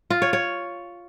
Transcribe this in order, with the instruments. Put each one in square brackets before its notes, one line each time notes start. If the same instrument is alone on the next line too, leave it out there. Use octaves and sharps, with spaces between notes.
[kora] F4
C#5
C#5